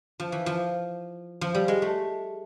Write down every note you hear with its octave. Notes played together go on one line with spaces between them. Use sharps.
F3
E3
F3
F3
G3
G#3
A3